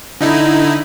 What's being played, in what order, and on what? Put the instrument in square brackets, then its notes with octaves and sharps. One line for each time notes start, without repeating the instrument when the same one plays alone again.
[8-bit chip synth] D3 D#4 E4